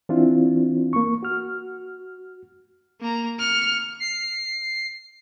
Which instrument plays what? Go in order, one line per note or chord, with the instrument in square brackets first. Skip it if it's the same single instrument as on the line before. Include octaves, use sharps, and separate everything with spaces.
[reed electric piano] E3 C4 D4 E4 F4
A#3 C#6
F#4 F6
[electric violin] A#3 A#5
F6 C#7
[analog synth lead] C7